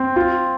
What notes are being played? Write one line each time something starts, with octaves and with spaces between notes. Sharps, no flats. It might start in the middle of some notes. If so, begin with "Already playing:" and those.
Already playing: C4
F4